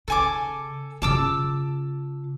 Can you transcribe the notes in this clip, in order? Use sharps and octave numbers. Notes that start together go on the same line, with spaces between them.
C#3 A4 G#5 D6
C#3 F4 A5 D6 E6